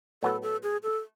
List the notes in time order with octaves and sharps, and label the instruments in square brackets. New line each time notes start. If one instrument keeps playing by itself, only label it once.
[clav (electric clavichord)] A2 F#3 B3 F#4 B4 [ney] A4
[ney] A4
G#4
A4